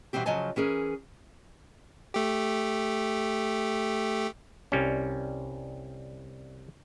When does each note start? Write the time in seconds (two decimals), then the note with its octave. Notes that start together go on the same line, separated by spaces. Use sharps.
0.13 B2 E3 G3 C4 G4
0.26 C#3 F3 F#3 D#5 G#5 A5
0.56 E3 C#4 G#4 A#4
2.14 A3 G4
4.72 C2 G3 C#4